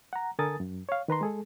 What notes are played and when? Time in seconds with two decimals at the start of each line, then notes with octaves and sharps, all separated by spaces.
0.13 F#5 A#5
0.39 D3 A4 A#4 G#5 D#6 A6
0.60 F#2
0.89 C#5 F5
1.08 D#3 B4 A#5 C6
1.21 G#3 G#4 A4